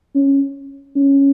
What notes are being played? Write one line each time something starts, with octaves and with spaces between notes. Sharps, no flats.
C#4
C#4